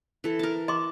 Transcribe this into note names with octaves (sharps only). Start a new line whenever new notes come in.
E3 A4
A#4 A5
D#5 A5 C6 D6